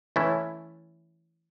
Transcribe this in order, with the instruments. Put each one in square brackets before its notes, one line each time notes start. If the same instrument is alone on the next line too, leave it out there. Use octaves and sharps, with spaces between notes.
[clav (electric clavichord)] E3 A3 C#4 E4